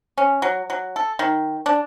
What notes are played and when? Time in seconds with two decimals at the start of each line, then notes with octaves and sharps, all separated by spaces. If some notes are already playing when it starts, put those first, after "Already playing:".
0.18 C#4
0.42 F#3
0.70 F#3
0.96 A4
1.19 D#3
1.66 D4